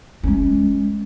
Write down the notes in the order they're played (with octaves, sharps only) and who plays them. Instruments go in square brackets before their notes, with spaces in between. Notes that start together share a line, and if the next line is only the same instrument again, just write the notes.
[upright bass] G#3 C#4